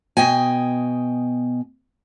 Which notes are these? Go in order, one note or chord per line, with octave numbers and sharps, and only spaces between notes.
B2 D#5 G5 G#5